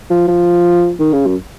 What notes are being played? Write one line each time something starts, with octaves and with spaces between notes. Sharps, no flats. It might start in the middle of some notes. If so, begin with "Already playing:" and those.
F3
F3
D#3
C#3
F#2